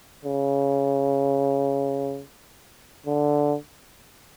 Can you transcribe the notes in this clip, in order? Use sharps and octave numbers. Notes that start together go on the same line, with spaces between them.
C#3
D3